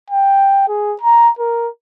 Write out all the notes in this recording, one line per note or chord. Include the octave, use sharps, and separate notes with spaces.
G5
G#4
A#5
A#4